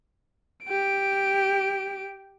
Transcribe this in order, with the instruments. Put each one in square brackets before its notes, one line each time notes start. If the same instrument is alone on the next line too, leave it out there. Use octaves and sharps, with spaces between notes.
[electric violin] G4 D7